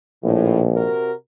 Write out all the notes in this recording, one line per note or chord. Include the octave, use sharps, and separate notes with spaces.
A#1 A2
C3 F#4 A#4